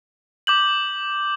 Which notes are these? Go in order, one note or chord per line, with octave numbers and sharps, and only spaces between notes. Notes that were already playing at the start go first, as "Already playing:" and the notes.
D6 G6 F#7